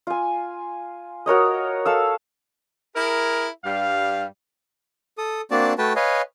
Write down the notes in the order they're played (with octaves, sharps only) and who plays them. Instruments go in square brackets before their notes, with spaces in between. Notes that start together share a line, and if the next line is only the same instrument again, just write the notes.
[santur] F4 G#5
F#4 A#4 C#5 D#5
A4 F5 E6
[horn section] E4 G#4 A#4
G2 G3 F5
[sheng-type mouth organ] A4 D#6
A#3 C4 D4 F#4 D5 A5
A3 F#4 B4 G5 A5
B4 C#5 D#5 F5 G#5